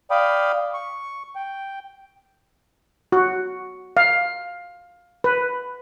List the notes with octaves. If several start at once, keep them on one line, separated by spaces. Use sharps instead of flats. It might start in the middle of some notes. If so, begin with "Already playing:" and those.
D5 F5 G5 B5 D#6
C#6
G5
F#4
F5
B4